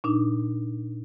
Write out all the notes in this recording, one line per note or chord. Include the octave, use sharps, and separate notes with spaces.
A#2 D4 D#4